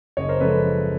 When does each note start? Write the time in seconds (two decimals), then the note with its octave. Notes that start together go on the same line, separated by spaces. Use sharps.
0.17 F#1 C#5 D#5
0.29 A#4 C5
0.41 C#3 F3 G#3 A4 B4